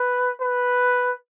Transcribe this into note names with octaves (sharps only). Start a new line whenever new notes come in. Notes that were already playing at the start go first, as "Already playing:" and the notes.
Already playing: B4
B4